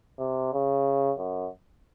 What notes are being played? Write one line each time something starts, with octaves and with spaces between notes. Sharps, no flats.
C3
C#3
F#2